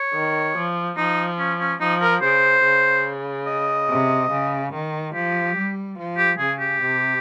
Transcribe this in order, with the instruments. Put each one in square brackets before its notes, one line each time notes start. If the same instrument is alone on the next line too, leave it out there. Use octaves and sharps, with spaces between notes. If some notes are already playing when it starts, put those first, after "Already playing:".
Already playing: [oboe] C#5
[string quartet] D#3
F3
[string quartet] F3 [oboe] D#4
[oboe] C#4
C#4
[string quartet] F3 [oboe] D#4
[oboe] A#4
[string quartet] C#3 [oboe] C5
[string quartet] C#3
[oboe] D#5
[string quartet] C3
C#3
D#3
[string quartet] F3 [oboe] G4
[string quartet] G3
F3
[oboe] G4
[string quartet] C#3 [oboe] G#4
[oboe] G4
[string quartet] C3